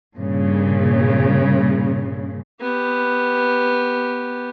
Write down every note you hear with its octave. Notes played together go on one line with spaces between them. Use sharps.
G2 A#2 C#3
B3 G4